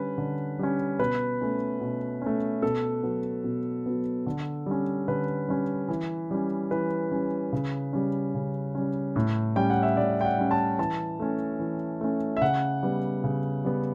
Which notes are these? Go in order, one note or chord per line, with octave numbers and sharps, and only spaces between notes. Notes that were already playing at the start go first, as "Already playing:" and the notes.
Already playing: D3 G3 C#4 B4
D3
G3 C#4
B2 B4
A3 C#4
B2
A3 C#4
B2 A4
F#3 B3
B2
F#3 B3
D3
G3 C#4
D3 B4
G3 C#4
E3
G3 C#4
E3 B4
G3 C#4
C#3
G3 C#4
C#3
G3 C#4
A2
G3 C#4 G5
F#5
E5
A2 D5
G5
F#5
G3 C#4
A5
E3 A5
A3 C#4
E3
A3 C#4
E5
C#3 F#5
G3 B3
C#3
G3 B3